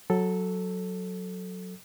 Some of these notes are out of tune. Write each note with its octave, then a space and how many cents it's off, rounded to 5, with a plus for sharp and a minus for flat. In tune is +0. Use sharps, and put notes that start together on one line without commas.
F#3 -10 A4 +0